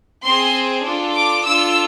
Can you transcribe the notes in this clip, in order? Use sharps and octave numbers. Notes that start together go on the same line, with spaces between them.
C4 G#4 C6
D4 F4 A4
D6
D4 F4 A4 E6